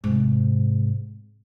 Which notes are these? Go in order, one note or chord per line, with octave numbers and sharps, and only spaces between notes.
G#2 C3